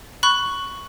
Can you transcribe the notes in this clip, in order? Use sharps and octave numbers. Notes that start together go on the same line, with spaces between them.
B5 C#6 F#6